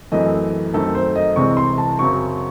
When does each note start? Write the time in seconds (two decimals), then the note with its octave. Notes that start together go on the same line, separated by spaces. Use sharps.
0.12 F#2 E3 A3 C4 D#5
0.74 F#2 D#3 A3 C4 A4
0.95 C5
1.16 D#5
1.36 C2 C3 E3 G#3 C4 C#6
1.57 C6
1.78 A5
1.99 F#2 C#3 F#3 C4 C#6